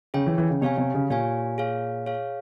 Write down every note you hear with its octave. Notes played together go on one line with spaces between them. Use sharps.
C#3 G#4 C#5 G5
E3
E3
C#3
C3 G4 C#5 F5 G#5
C3
C#3
A#2 G4 C#5 F5 G#5
G#4 C#5 F5
G#4 C#5 F5